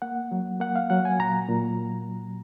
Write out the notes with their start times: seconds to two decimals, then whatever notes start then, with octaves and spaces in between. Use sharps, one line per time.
0.02 A#3 F#5
0.31 F#3
0.60 A#3 F#5
0.76 F5
0.90 F#3 F#5
1.05 G#5
1.19 A#2 A#5
1.49 A#2